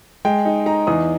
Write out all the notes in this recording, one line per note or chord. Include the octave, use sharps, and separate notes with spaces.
G#3 G5
D#4
D#4 A#5
E2 D#6